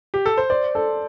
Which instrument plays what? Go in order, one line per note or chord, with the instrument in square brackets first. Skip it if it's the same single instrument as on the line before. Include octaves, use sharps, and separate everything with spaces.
[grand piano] G4
A4
C5
[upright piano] C5 [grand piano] D5
[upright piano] A4